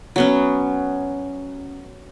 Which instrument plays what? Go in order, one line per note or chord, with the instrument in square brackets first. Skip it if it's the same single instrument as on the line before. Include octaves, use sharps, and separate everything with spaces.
[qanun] F#3 B3 C#4